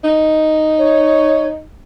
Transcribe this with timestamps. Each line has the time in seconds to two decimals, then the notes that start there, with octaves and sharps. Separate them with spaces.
0.04 D#4
0.78 C#5